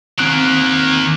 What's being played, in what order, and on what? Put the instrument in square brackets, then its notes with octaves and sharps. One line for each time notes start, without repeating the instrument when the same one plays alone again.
[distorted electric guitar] D#3 A#3 [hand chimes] C4 F#6 D7